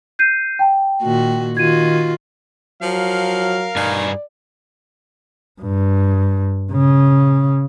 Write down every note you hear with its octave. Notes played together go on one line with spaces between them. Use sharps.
G6 C7 D#7
G5 A5
A#2 D#3 F#4
D#3 F4 F#4 G#6 D#7
F3 F#3 A#4 F5
G2 D#4 G#4 D5
G2
C#3